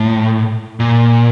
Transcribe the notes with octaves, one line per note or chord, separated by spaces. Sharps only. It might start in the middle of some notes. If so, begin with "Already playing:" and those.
Already playing: A2
A#2